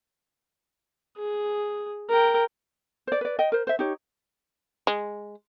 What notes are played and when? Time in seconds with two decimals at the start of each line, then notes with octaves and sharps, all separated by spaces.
1.18 G#4
2.09 A#4 G5
3.07 C5 D5
3.21 B4 D5
3.39 D#5 G5
3.52 A#4 C5
3.67 C5 E5
3.79 D#4 G4 C#5
4.87 G#3